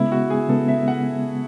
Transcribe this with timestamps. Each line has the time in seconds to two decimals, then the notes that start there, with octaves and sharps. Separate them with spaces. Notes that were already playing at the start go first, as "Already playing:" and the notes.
Already playing: C#3 G#3 B3 E4
0.12 F#4
0.30 G#4
0.49 C#3 G#3 B3 A4
0.68 E5
0.88 F#5